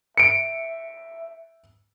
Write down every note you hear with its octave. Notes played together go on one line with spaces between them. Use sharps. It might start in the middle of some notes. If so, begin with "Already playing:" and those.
E5 C#7 D7